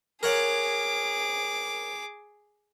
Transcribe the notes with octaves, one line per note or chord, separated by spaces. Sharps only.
G#4 A#4 C#5 F#5 D6